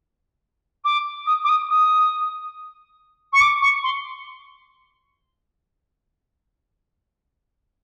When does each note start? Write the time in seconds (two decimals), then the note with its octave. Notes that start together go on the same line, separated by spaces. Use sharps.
0.84 D6
1.26 D#6
1.43 D6
1.48 D#6
1.69 D#6
3.33 C#6
3.40 D6
3.61 C#6
3.83 C6